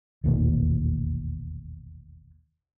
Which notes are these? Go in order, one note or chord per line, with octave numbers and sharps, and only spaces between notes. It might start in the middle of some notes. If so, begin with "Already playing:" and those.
E1 A1 D#2 A#2